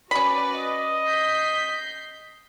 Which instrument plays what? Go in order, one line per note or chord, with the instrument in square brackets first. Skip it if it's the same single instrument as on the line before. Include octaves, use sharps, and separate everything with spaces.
[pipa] C#4 B5 [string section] F#4 B4 D5
[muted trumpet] D#5
[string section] G6 B6 C7